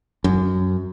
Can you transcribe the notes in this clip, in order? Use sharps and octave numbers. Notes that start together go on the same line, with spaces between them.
F#2